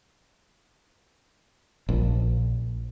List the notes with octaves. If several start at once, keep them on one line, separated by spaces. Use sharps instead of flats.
A#1